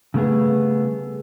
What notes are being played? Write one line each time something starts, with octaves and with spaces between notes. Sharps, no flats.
C#3 G3 A3 B3 G#4